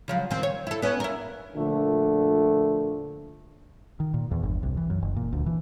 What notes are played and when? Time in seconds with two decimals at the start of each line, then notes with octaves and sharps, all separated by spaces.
0.08 C#3 F3 F#3
0.31 D#3 C4
0.43 C#5
0.67 E4 A4
0.82 B3 C#4
1.00 E4 A#4
1.55 A#2 D3 F3 A3
4.00 D#3
4.14 A#2
4.31 E2
4.43 G1
4.63 C2
4.77 E3
4.90 F#2
5.02 F#1
5.16 A#2
5.33 D2
5.46 E3